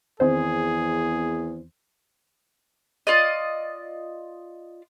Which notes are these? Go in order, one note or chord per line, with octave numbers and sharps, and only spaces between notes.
E2 D#3 C4 G#4 C5
F4 D5 D#5